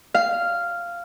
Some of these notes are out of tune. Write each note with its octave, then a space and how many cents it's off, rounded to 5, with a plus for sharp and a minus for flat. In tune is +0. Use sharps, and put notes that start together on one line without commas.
F5 -10